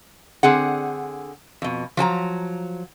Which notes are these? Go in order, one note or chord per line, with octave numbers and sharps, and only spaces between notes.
D3 C4 G#4 F#5
F2 B2
F3 F#3 G#5 A#5